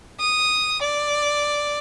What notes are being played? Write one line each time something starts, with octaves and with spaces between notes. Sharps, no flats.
D#6
D5